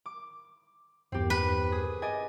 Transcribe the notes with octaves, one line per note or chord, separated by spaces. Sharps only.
D6
E2 G2 C4 G4
B4
G#4
D5 D#5 G#5